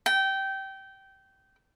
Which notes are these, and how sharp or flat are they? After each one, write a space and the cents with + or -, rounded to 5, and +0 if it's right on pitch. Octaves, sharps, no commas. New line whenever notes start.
G5 -20